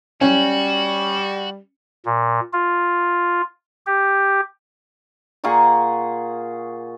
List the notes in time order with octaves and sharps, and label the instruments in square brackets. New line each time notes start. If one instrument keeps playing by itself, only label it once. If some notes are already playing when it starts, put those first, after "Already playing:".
[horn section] G3 [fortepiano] C#4 [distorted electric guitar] F#4
[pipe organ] A#2
F4
G4
[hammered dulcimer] A#2 G#4 F#5 C#6